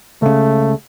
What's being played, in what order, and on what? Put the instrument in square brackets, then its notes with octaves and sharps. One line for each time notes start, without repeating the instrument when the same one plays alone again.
[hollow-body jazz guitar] C#2 C#3 [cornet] A3